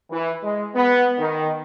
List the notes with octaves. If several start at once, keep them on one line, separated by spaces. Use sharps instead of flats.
E3
G#3
B3
D#3